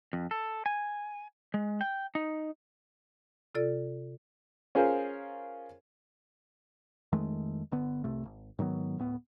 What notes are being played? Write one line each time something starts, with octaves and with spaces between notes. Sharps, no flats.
F2
A4
G#5
G#3
G5
D#4
C3 F4 A4 D5
C#4 F4 G#4 A#4 C5
F2 D#3 G#3 A3
G1 D3 B3
F1 C2 C3 A3
G#1
G#2 D#3 F#3 B3
D1 A2 B3